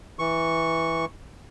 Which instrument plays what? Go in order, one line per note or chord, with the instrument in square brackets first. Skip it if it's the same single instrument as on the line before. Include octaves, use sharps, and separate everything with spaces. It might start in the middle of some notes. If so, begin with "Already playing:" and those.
[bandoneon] E3 C#6